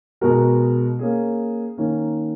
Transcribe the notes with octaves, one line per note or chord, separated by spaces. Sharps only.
B2 G#3 B3 F#4 A#4
A#3 C#4 G#4
D#3 A#3 C#4